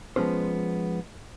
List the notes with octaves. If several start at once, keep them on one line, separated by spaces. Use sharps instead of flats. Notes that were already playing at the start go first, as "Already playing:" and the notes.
F3 G#3 B3 C#4 C5